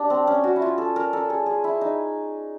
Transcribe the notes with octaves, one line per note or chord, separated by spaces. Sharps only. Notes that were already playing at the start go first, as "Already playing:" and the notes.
Already playing: D4 G4
C4
C#4
F#4
E4
F4
A4
A#4
A4
G#4
G#4
E4
D#4